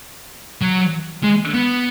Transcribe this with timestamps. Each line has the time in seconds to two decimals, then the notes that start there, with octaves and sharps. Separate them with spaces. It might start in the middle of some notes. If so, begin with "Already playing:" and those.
0.62 F#3
1.24 G#3
1.54 B3